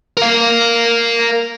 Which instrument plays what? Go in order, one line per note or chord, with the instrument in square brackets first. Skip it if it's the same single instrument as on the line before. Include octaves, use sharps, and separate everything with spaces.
[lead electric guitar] A#4 F5